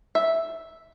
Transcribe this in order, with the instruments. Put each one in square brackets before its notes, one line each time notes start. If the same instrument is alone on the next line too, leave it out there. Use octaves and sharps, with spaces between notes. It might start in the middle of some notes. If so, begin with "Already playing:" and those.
[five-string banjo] E5